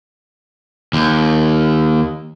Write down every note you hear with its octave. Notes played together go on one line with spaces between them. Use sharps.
D#2